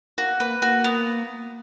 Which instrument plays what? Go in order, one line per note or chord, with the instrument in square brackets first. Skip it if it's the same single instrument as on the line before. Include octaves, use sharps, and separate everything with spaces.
[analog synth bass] A#3 [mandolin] F#4
[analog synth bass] A#3 [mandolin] B4
[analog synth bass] A#3 [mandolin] F#4
[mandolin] B3